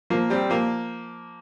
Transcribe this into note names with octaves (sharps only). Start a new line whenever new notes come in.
F3 A#3
G3 C4
F3 A#3